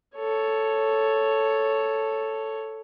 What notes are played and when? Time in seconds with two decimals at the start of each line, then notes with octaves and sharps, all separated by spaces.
0.17 A4 C#5